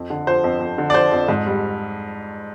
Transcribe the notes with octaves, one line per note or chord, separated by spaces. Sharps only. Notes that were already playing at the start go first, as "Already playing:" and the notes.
Already playing: F2
D3
F3 C5
F2
F2
D3
D5
F3 C5
F2
G#2
G3